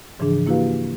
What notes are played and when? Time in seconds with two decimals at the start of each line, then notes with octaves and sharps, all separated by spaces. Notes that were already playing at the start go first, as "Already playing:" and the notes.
0.19 G#2 C#3 E3 F3 D4 G#4
0.47 A#3 E4 F#4 G4 B4 F5